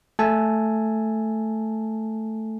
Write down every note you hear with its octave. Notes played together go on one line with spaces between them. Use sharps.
A3 A4 G#5 A5